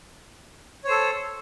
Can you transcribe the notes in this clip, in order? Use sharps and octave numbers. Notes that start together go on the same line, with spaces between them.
A4 C5 C#5